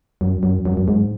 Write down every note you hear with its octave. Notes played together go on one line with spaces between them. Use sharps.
F#2
F#2
F#2
F#2
G#2